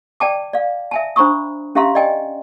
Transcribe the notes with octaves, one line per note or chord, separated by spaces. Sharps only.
D5 G5 A5 D6
D5 F5
E5 G#5 A5
D4 C5 A#5 B5 C#6 D#6
C#4 G4 E5 F5 A#5 C6
D5 D#5 G5 G#5